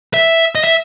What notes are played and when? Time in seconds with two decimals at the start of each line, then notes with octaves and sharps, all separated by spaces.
0.14 E5
0.55 D#5
0.64 E5